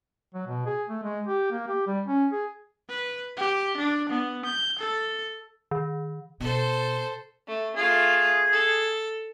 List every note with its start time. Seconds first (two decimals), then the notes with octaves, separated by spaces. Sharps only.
0.34 F#3
0.46 B2
0.66 G#4
0.89 A3
1.03 G#3
1.27 G4
1.51 A#3
1.68 G4
1.87 G3
2.07 C#4
2.32 G#4
2.89 B4
3.37 G4
3.77 D4
4.10 B3
4.46 G6
4.79 A4
5.71 D#3
6.40 B2 A4 C5
7.47 A3
7.76 A3 F4 G#4
8.52 A4